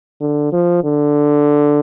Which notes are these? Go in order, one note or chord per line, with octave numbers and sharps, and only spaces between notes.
D3
F3
D3